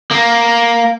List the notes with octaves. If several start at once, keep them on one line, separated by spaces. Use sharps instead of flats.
A#3